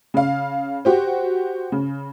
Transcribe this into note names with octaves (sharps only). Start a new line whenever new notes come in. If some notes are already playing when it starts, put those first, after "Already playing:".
C#3 F5
F#4 G4 C5
C#3